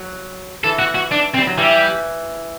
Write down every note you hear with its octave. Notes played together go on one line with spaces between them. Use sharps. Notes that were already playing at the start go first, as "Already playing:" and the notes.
Already playing: F#3
E3 A4
F#4
F#4
D4
C4
G3
F#3
E3 G3